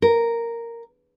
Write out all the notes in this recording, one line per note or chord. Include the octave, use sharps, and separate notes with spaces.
A#4